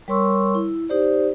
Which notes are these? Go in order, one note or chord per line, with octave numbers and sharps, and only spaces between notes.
G3 A#4 C#5 C6 C#6 E6
E4
D#4 G4 C5 D5